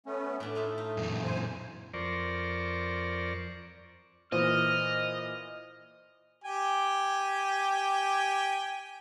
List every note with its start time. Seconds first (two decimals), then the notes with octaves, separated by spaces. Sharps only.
0.06 A3 B3 C#4
0.40 A2 D4
0.55 A3 D#4 F4 E5
0.78 D#4
0.97 F#2 A#2 E3
1.24 C5 G#5
1.94 F2 A#4 C5 D5 C#6
4.32 A#2 E3 C5 D#5 F6
6.44 G4 G5 G#5